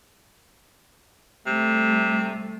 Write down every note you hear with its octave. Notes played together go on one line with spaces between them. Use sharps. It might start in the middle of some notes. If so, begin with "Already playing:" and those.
C3 G3 A3